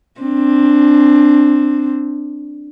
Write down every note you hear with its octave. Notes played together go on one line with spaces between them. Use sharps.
C4 D4